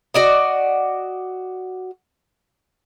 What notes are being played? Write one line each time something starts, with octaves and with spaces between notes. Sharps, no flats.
F#4 D5 D#5